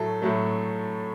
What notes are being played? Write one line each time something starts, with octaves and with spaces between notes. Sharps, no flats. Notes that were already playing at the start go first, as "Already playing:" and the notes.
Already playing: A2 F#3 A3 A4
A2 F#3 A3